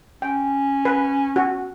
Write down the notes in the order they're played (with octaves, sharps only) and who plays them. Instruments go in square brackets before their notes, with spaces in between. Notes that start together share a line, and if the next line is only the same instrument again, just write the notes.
[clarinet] C#4 [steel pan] G5
[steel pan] B4
F#4